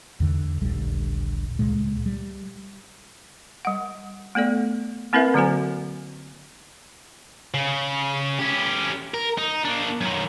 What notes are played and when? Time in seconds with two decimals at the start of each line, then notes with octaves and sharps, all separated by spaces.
0.20 E2 D3
0.61 D#1 A#1 D3 G3
1.59 C#2 A#2 G#3
2.06 G3
3.65 G3 F#5
4.35 A3 B3 A4 D5
5.13 A#3 C4 E4 A#4 B4 E5
5.34 D3 F#3 A#3 F#4 C5 G#5
7.54 C#3
8.39 C#4 G4
9.14 A#4
9.38 D#4
9.65 A#3 D4
10.01 F#2 D#3